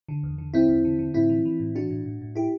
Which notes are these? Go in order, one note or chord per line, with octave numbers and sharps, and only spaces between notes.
D3
E2
D3
D3 C4 E4
E2
D3
D3
A2 C4 E4
E3
E3
A2
E3 D4 F#4
A2
A2
A2
E4 G4